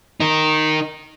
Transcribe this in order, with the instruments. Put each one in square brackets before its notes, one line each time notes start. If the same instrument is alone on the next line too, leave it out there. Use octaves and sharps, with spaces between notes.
[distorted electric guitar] D#4 A#4